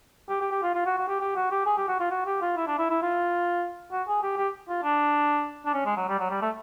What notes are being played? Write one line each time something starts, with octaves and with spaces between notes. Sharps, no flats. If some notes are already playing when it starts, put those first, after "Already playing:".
G4
G4
G4
F4
F4
F#4
F#4
G4
G4
F#4
G4
G#4
G4
F#4
F4
F#4
G4
F4
E4
D4
E4
E4
F4
F#4
G#4
G4
G4
F4
D4
D4
C#4
G#3
F#3
G3
F#3
G3
A3